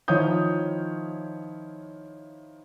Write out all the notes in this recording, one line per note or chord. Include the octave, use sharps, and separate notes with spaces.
D#3 F3 E4 C#5 D#6 G6